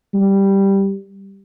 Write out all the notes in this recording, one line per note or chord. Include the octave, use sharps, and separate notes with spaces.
G3